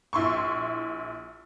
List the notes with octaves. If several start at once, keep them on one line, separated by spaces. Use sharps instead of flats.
A#1 E4 C6 C#6